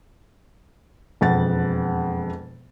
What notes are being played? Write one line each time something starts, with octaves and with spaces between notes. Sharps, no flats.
E1 F2 F#5 A6